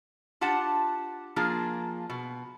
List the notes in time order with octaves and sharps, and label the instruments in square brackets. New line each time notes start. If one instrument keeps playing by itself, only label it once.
[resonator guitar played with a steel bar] D4 F4 G4 F#5 A5
F3 A#3 D4 F4 G#4
B2